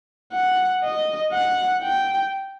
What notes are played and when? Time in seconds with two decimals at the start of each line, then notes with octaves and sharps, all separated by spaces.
0.33 F#5
0.83 D#5
1.33 F#5
1.83 G5